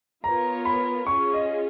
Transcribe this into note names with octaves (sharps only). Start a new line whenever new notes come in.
B3 F4 A#4 C#5 A#5
B5
C#4 F4 G#4 C#6
D#5